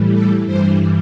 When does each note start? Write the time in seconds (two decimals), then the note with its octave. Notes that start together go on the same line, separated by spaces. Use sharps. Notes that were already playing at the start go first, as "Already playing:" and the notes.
Already playing: A2 E3 G3
0.12 A4
0.44 G2 E3 G3 C5